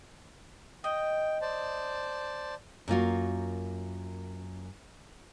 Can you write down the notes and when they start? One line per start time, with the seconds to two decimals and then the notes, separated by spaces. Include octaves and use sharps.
0.84 D#5 G5
1.41 C5 D5 A5
2.88 F#2 A#3 F4 F#4